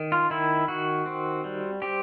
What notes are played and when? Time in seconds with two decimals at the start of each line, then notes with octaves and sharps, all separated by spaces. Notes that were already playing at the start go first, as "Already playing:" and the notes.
Already playing: D#3
0.12 F4
0.30 D#3 E4
0.68 D#3 F#4
1.06 C4
1.44 G3
1.82 C4 G4